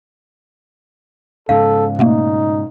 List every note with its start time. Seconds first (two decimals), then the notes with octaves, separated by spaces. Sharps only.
1.49 G#2 C#3 A4 F5
1.99 B2 A3 A#3 D#4